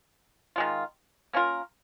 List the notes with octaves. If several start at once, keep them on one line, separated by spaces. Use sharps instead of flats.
D#3 G#3 F4
A#3 C#4 F4 A#4